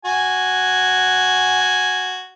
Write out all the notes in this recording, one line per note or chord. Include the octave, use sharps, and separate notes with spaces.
F#4 G#5